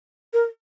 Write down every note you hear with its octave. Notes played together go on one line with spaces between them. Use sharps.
A#4